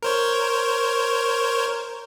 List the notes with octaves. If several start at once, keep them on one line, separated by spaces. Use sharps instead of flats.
A#4 C5 C#5